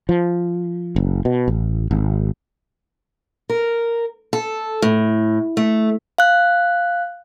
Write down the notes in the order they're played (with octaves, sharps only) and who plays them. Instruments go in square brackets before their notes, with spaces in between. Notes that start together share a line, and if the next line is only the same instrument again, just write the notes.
[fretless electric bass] F3
F#1
B2
A1
G#1
[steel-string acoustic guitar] A#4
A4
A2
A3
[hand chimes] F5 F#6